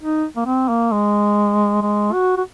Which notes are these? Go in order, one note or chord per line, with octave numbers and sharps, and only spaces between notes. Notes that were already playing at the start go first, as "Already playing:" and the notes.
D#4
A#3
C4
A#3
G#3
G#3
F#4
F#4